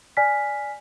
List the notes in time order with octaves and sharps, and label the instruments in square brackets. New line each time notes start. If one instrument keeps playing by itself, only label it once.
[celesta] D5 G#5 F6 B6